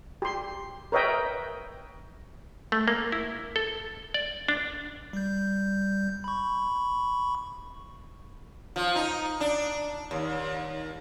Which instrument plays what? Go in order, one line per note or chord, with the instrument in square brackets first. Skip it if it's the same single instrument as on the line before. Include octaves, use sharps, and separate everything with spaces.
[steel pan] G4 C6
A#4 B4 C#5 D#5 E5 G5
[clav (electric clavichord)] A3
A#3
E4
A4
D5
D4
[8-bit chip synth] G3 G6
B5 C#6
[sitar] F3
D#4
D4
D#2